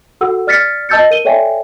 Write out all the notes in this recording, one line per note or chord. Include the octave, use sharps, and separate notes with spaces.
F#4 A4 F#5 E6
D5 F6 A6 B6 C#7
D#5 A5 E6 G6 A6 C#7
A#4 D#7 G7
A4 C#5 D5 E5 G5 G#5